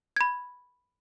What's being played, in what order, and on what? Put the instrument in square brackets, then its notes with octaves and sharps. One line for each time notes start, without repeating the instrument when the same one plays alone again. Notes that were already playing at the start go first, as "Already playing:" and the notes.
[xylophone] B5 G#6